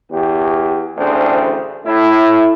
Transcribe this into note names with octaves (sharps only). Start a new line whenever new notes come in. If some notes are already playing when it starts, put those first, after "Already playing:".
E2 G4
A1 D2 C#3 C4 D4
A2 E4